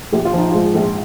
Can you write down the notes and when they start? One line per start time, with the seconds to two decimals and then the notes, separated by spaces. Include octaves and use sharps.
0.12 A#1 G4
0.25 F4
0.33 F3 D#4
0.51 G#2 F4
0.75 A#1